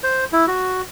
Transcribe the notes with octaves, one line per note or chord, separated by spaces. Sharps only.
C5
E4
F#4